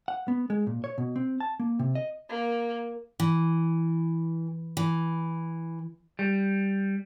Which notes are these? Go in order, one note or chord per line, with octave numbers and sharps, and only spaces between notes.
F#5
B3
G#3
A#2
C#5
B2
C4
A5
A#3
C3
D#5
A#3
E3
E3
G3